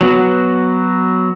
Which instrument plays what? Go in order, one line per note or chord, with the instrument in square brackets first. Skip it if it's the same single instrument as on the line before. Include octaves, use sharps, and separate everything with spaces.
[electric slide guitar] F#3 B3 F#4